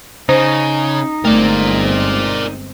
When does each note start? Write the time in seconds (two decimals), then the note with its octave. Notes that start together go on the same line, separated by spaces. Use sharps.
0.29 C#3 D#4 C5
1.25 G1 G#3 A3 C4 A#4 D5